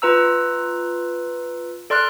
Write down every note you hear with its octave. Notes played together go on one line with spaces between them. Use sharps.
F4 B4 A#5 E6
A4 D5 C6 F6 F#6